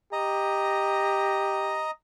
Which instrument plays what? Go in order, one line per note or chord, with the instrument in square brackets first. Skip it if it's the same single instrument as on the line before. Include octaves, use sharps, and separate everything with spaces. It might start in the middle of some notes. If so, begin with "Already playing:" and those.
[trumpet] G4 [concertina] D#5 A#5